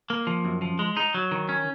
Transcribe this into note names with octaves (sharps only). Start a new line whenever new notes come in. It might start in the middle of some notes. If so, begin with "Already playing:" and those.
A#3
F3
F#2
F3
G#3
D#4
F#3
D#3
C#4